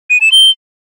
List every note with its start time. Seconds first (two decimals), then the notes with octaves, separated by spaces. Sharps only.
0.10 D#7
0.21 E7
0.32 G7